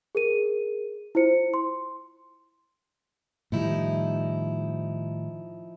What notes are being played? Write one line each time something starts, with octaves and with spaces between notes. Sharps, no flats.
G#4 A#4 D#7
E4 F4 C5 C#7
C6
A2 D#3 F3 G3 D#4 E4